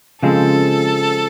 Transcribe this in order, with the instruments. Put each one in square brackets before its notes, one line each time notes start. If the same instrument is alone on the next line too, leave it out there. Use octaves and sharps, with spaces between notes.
[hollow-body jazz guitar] C#3 F3 G#3 C4 [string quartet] A4